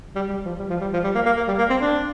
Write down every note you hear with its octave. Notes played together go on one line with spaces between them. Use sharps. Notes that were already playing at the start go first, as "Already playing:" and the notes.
G3
G3
F3
G3
F3
G3
F3
G3
A#3
A#3
A#3
G3
A#3
C4
D4